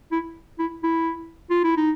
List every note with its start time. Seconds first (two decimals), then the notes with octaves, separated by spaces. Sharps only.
0.12 E4
0.59 E4
0.83 E4
1.50 F4
1.64 E4
1.77 D#4